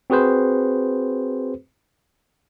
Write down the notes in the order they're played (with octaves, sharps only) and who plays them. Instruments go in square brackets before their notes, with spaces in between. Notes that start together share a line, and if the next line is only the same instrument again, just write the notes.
[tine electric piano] C4 F#4 G#4 B4 C5